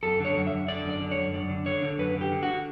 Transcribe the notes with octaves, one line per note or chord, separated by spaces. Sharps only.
F#2 A4
D3 C#5
F#2
F#2 E5
D3 D5
F#2
D5
D3
C#5
F#2
F#2 D5
D3
D3 C#5
D3
F#2 B4
D3
G4
D3
D3 F#4